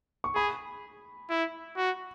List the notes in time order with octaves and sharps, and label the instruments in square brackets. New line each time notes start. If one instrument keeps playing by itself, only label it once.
[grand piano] C#6
[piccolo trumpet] G#4 [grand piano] B5
[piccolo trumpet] E4
F#4